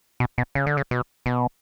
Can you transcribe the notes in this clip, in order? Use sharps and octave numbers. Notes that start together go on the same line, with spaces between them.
B2
B2
C#3
D3
C#3
B2
B2